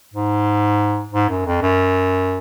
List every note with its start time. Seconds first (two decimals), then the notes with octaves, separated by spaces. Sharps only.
0.14 G#2
1.13 G#2
1.29 F#2
1.46 F2
1.62 F#2